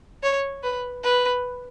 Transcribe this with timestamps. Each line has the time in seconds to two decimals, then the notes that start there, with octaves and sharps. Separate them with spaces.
0.23 C#5
0.63 B4
1.04 B4